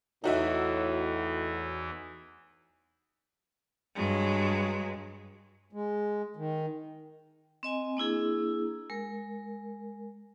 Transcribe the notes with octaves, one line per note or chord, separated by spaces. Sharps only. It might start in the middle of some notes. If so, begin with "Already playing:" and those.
E2 A2 E3 D#4 F#4 E5
G2 F#3 G#3
G#3
D#3
C4 D#5 G#5
A#3 D4 E4 G#4
G#3 A#4